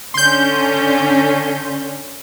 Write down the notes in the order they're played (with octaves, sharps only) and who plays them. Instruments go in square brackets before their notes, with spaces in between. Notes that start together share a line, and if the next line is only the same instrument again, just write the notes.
[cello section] D3 C#4 [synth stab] C6 G6